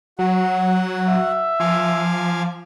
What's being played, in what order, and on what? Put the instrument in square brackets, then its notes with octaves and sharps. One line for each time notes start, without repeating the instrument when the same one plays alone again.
[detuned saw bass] F#3 [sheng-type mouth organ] F#4 F#5
[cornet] E5
[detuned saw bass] F3 [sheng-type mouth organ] F5 G#5 D6